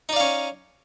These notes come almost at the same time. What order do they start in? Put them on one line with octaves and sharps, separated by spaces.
D#4 D5 F5 C#4